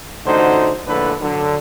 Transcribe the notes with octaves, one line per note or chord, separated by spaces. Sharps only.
A1 A2 D3 D#4 F#4 C5
A#1 A2 D3 A4 B4
D3 F#3